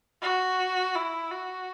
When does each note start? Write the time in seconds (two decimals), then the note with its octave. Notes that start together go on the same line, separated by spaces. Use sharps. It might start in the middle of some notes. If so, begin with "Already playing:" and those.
0.22 F#4
0.95 E4
1.31 F#4